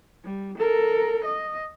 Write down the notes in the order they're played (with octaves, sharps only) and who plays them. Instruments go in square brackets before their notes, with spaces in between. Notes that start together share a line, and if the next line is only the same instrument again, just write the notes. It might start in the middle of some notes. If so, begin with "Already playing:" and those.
[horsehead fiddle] G3
A4 A#4
D#5